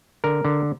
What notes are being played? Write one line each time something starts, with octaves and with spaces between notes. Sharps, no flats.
D3 A#4
D3